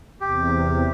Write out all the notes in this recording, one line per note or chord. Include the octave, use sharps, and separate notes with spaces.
E2 C3 G4